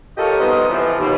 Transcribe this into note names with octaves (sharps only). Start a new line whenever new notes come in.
F4 G4 A4 A#4 C#5 D#5
G3 B3 D#4 C5 D#5
C3 E3 F3
D#2 B2